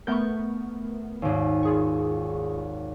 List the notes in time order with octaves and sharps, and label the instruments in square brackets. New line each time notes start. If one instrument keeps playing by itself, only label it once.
[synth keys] A3 B3 A#4 [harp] C#6 G6
[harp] G#1 D#2
[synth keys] F4 G#4 C#6